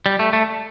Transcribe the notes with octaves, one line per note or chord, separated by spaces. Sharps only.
G3
A3
A3